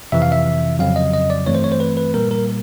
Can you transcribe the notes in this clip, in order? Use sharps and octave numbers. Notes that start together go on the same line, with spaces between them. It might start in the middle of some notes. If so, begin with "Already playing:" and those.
F2 C3 E3 E5
F5
E5
F2 C#3 F#3 F5
D#5
D#5
D5
G2 E3 A3 C4 C#5
C5
C#5
C5
B4
B4
A#2 G3 A#3 A#4
A#4